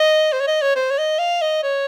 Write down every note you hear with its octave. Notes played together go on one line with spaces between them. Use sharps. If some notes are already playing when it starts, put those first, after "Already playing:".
Already playing: D#5
C5
C#5
D#5
C#5
C5
C#5
D#5
F5
D#5
C#5